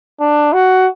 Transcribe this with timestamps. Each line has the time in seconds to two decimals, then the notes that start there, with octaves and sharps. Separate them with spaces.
0.20 D4
0.53 F#4